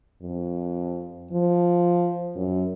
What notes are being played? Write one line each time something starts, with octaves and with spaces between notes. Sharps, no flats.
F2
F3
F#2